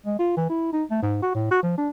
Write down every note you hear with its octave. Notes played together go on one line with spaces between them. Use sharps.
G#3
F4
E3
E4
D#4
A3
G#2
F#4
A2
F#4
F3
D4